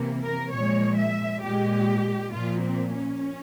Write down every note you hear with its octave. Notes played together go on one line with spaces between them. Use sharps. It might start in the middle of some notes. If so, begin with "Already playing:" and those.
Already playing: C3 E3 A#3
A#4
A#2 F3 G#3 C#5
E5
A#2 G#3 G4
A#2 F3 A#3 F4
C4
C#4